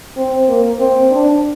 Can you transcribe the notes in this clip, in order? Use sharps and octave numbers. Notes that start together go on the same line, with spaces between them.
C4
A#3
C4
D4